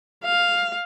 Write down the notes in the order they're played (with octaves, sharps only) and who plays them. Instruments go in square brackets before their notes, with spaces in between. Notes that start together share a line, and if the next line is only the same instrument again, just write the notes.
[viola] F5